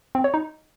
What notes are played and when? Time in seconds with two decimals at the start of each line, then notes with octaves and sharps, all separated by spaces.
0.15 C4
0.24 C#5
0.34 D#4